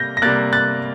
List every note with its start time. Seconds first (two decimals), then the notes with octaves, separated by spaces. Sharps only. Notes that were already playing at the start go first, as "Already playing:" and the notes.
Already playing: C3 G3 A#3 G6 A#6
0.17 A#6
0.22 C3 G3 A#3 F#6 A6
0.53 F#6 A6